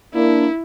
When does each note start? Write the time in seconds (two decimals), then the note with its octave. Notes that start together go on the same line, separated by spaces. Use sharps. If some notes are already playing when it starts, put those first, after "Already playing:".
0.14 A#3 D4 E4